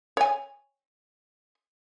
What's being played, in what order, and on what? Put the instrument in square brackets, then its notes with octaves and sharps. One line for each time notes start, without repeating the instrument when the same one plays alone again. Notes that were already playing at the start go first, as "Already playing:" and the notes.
[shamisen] C#5 G#5